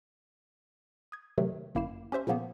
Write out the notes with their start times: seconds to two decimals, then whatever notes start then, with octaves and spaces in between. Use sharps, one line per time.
1.12 D#6 G#6
1.38 C3 D#3 F#3 A3
1.75 G1 F#2 A#3 E4 C7 E7
2.12 C#4 G4 C5 E5 C6
2.27 A#2 C#3 F3 A#3 B3